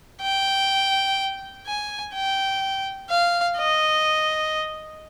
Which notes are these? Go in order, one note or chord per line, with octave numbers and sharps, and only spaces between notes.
G5
G#5
G5
F5
D#5